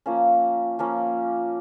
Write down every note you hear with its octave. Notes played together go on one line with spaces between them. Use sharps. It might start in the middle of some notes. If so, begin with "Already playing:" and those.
F3 A#3 C#4
F3 A#3 C#4